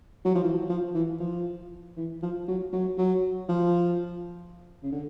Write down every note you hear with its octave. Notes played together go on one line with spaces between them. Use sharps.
F#3
F3
E3
F3
E3
F3
E3
F3
F#3
F#3
F#3
F3
C#3
D3